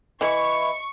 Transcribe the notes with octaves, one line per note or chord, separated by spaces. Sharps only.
E3 E4 D#5 C#6